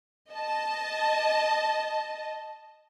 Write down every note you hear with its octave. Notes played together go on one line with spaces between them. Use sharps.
D#5 A5